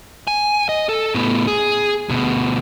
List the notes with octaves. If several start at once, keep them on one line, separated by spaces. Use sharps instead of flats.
G#5
D#5
A4
A2 B3
G#4
D2 B2